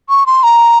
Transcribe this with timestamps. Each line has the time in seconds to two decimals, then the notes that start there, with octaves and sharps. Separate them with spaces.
0.09 C#6
0.26 C6
0.43 A#5